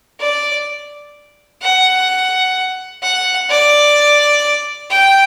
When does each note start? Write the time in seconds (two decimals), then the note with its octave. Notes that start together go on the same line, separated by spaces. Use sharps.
0.20 D5
1.62 F#5
3.03 F#5
3.50 D5
4.91 G5